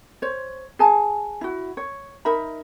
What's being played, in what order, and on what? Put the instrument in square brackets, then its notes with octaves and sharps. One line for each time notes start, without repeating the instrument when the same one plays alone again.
[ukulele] C5 C#5
G#4 G#5 A5
E4 F#4
C#5
D#4 A#4 E5 B5